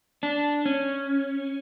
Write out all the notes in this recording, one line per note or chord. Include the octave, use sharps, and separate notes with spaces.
D4
C#4